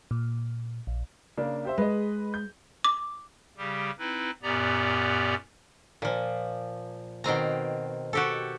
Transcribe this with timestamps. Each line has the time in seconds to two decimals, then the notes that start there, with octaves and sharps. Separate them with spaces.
0.11 A#2
0.87 A#1
1.37 C#3 A#3 D4
1.65 G4 C5 E5
1.78 G#3 B4 D#5
2.34 G6
2.84 D6
3.57 C#3 G3 G4
3.99 C4 D#4 E4 B4
4.43 F#2 A#2 B3 G4 D5 A#5
6.02 A#2 F3
7.24 B2 D#3 C4 A#5
8.13 F#4 G4 A4